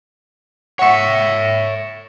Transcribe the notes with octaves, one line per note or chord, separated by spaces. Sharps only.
C#5 E5 F#5 C#6